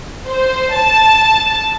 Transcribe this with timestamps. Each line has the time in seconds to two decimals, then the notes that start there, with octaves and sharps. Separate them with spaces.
0.28 C5
0.75 A5